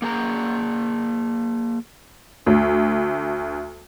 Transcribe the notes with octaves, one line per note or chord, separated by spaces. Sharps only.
A#3 G#4 A#5
D2